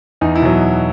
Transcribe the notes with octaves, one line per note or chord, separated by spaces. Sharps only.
E2 D#4
E4
B2 F#3